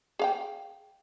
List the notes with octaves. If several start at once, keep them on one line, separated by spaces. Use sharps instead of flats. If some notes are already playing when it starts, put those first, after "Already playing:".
G#4 F5 G5